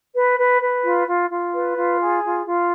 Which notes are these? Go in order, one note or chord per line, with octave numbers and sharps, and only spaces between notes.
B4
B4
B4
F4
F4
F4
B4
F4
G#4
F4
F4